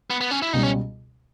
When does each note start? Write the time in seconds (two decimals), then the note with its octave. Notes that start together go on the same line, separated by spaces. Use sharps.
0.10 B3
0.21 B3
0.31 C#4
0.42 E4
0.53 C#2 B2 G3 D#4
0.63 C#4